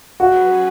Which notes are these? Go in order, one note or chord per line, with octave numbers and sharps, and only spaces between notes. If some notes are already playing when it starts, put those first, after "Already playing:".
F#3 C#4 F#4 G#4 B4